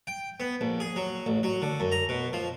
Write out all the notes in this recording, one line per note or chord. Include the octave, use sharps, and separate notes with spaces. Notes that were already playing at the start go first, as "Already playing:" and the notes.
G5
B3
A#1
G#4
F#3
A1
F#3
D3
F#2
A#5
B2
F3